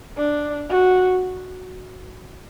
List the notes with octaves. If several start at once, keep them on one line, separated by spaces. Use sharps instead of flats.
D4
F#4